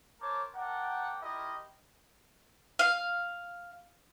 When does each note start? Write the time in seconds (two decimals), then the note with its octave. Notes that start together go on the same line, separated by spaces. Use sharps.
0.21 A#4 C5 C#5 A5 D6
0.54 A#4 D5 F#5 G5 A5
1.22 E4 F4 G4 A#4 D#5
2.79 F5